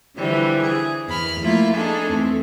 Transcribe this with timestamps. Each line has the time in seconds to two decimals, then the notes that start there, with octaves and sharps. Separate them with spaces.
0.17 D3 E3 F3 G3
0.63 G#4
1.07 E2 B5 F6
1.41 F3 A3 A#3 E4 F4
1.76 D4 D#4 G#4 A4
2.09 E2 A3 C4